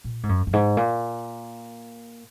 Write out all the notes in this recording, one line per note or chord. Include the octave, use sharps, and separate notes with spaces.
A#2
G#2
F#2
F#2
G#2
A#2